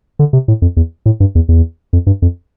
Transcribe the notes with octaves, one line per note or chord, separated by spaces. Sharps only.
D3
C3
A2
F2
E2
A2
G2
E2
E2
F2
G2
F2